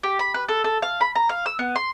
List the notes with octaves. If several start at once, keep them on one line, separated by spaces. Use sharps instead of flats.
G4
B5
B4
A4
A4
F5
B5
A#5
F5
E6
B3
C6